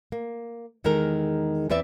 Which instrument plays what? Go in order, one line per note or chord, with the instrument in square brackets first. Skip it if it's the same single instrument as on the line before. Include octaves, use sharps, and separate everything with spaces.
[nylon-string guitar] A#3
E2 D#3 G#3 D#4 A4 A#4
E2 C4 B4 D5 E5